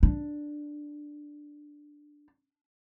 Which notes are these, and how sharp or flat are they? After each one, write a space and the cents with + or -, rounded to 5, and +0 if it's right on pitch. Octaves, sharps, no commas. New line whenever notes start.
D4 +5